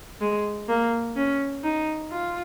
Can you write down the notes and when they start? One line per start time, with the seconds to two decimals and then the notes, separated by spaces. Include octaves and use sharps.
0.21 G#3
0.69 A#3
1.16 C#4
1.64 D#4
2.11 F4